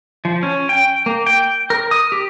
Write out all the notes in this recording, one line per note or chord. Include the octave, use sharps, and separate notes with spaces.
F3
C#4
G5
A#3
G5
A#4
D#6
G4